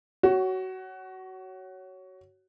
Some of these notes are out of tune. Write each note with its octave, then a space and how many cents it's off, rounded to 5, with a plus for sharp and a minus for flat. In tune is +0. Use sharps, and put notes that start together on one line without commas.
F#4 +20 C#5 +0